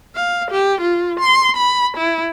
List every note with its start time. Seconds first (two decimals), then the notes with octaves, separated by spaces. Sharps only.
0.15 F5
0.51 G4
0.81 F4
1.20 C6
1.57 B5
1.97 E4